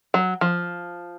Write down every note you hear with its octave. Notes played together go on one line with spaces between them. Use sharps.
F#3
F3